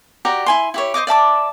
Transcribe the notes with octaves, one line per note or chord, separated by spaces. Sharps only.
F#4 G4 D5 A#5
E4 G#5 C6
E4 G4 C#5
C5 C#5 D#5 D6
D5 E5 A5 D6